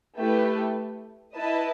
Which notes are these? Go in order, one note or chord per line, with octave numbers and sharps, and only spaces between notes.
A3 E4 G4 B4
E4 B4 D#5 A5